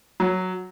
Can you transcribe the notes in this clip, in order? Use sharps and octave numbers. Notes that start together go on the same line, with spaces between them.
F#3